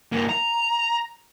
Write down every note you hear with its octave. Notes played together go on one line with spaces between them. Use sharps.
G2 A#3
A#5